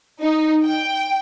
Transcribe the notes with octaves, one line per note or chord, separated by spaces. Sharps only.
D#4
G5